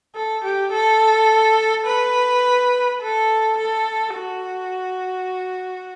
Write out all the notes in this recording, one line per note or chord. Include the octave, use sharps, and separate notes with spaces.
A4
G4
A4
B4
A4
A4
F#4